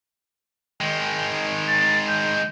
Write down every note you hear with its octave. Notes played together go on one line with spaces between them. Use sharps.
D#3 G#3 G5
A6
G6